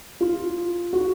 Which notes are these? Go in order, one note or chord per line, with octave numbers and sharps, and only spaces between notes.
F4
F#4